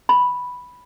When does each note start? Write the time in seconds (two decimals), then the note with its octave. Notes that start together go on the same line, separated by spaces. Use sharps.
0.09 B5